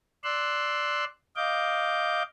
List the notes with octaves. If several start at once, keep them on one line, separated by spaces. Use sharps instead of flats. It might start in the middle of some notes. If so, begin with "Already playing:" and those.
D5 C6 E6 F#6
D#5 F5 D6 G6